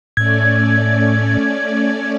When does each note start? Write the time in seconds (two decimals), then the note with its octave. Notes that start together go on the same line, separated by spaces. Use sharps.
0.17 A2 A3 C#4 D5 G#6